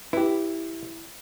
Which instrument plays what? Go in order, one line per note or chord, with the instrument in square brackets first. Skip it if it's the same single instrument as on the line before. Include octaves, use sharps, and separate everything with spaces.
[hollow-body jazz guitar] E4 [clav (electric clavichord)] G4 B4